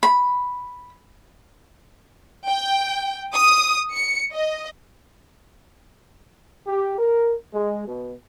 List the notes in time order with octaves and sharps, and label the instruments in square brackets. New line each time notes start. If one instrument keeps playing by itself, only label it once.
[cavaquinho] B5
[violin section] G5
D#6
C#7
D#5
[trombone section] G4
A#4
G#3
B2